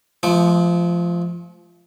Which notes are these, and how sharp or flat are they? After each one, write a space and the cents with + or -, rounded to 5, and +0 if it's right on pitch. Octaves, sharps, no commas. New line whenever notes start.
F3 -15 G#3 +45 D6 +40